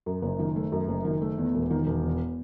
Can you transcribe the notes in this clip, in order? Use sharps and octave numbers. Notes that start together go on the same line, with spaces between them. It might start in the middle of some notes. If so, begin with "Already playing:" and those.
F#2
F#1
D#3
A3
F#2
F#1
D#3
A3
E2
E1
D#3
E1
E2